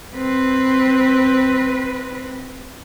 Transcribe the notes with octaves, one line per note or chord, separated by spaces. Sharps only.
C4 B4